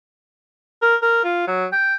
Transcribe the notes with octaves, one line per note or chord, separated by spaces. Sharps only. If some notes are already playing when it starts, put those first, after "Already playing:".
A#4
A#4
F4
F#3
G5